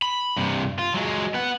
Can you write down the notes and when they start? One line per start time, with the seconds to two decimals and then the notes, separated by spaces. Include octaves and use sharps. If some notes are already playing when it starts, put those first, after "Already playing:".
0.02 B5
0.37 G2 C3
0.79 F4
0.94 F#3 G#3
1.34 B3 F#5